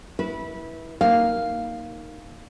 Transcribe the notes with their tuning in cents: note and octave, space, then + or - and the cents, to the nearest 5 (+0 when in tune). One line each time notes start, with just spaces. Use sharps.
E4 -15 B4 -20
A#3 +0 D#4 +0 F5 +0